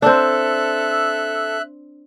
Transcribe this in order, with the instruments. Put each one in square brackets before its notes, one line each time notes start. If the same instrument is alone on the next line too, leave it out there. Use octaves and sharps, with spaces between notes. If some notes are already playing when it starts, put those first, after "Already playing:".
[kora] C4 D4 [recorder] A4 [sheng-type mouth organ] E5 F#6